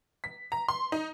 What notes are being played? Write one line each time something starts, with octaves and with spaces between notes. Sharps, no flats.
B6
A#5
C6
D#4